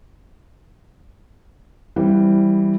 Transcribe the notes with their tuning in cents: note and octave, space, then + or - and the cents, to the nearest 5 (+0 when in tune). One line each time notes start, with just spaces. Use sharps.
E3 +0 G3 +0 C4 +10